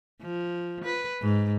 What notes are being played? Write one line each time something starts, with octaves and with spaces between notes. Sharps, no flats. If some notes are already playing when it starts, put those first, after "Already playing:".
F3
B4
G#2